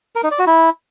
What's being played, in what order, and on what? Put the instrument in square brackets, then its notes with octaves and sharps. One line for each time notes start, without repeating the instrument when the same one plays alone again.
[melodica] A#4
D#4
D5
F#4
E4